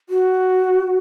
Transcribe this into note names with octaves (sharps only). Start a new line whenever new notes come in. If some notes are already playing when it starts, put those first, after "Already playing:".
F#4